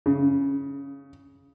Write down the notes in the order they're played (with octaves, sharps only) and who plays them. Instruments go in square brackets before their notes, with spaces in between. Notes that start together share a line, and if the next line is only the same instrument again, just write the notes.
[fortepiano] C#3